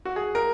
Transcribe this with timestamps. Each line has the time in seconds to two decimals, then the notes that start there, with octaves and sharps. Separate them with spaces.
0.05 F#4
0.16 G#4
0.35 A#4